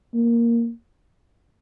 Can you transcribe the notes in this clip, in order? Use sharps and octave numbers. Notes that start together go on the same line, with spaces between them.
A#3